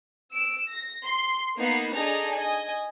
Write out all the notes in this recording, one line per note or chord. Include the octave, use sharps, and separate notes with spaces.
E6 D7
A#6
C6
A#3 B3 D#4 C7
D4 D#4 G#4 A4 D#5 A#5
D#5 G#5